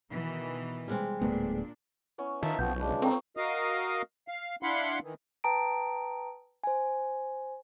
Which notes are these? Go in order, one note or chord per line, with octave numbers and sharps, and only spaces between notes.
B2 D#3 E3
G3 G#3 C4
D1 A#2 A3 B3 D4
B3 C#4 E4
D#3 D#4 F4 E5 A5
B1 F3 B3 C4 G6
C#3 G#3 D4 B4
C4 A4 C#5 F5 G5 A#5
F#4 A#4 D#5 F5 D#6
F5
D4 E4 F5 F#5 B5 C6
D#3 E3
B4 G5 A5 A#5 D#6 D7
C5 G#5